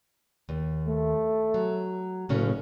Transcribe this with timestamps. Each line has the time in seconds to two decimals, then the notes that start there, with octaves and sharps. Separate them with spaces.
0.49 D#2
0.87 A3
1.54 F#3
2.29 F#1 A2 C#3 C#4